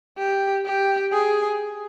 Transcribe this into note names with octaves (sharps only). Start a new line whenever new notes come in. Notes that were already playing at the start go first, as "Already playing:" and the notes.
G4
G4
G#4